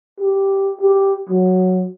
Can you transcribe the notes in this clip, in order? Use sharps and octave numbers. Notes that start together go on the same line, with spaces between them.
G4
G4
F#3